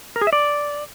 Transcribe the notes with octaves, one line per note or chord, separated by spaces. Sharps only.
A#4
G#4
E5
D5